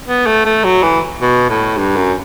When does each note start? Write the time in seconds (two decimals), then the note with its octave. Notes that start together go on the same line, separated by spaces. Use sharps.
0.07 B3
0.26 A3
0.45 A3
0.64 F#3
0.83 E3
1.21 B2
1.50 A2
1.78 G2
1.96 F#2